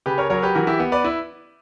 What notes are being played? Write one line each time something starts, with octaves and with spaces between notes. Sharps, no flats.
C#3 G4 B4
A#4 C#5
F#3 A#4 C#5
G4 B4
E3 F#4 A#4
E4 G4
B3
B4 D5
E4